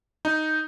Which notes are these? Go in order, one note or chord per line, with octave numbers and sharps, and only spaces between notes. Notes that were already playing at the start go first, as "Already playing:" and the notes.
D#4